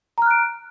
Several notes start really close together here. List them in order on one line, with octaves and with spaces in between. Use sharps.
A#5 F6 F#6 D7